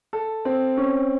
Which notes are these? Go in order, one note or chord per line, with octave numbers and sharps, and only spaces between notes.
A4
C4
C#4